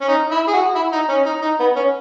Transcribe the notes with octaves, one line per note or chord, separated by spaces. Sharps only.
C#4
D#4
E4
G#4
F#4
E4
D#4
C#4
D#4
D#4
B3
C#4